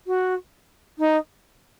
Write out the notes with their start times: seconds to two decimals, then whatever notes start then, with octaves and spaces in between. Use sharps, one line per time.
0.07 F#4
0.98 D#4